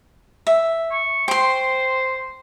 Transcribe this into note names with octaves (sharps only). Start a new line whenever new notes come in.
E5
C#6
C5 G5 C6